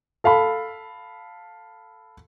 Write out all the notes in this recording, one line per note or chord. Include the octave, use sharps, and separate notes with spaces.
A4 F5 A5 B5